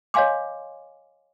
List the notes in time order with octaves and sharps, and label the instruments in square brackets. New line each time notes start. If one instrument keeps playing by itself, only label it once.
[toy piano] C#5 D#5 F5 G#5 C6 D6